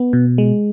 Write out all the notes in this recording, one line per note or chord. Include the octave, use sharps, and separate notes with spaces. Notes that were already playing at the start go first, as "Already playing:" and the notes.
Already playing: B3
B2
G#3